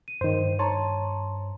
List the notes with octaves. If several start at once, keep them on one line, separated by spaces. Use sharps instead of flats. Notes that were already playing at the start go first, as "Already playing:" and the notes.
D#7
G2 D#3 C5
C#5 A5 A#5 C6